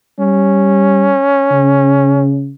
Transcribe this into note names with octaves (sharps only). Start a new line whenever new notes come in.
G3 C#4
C#3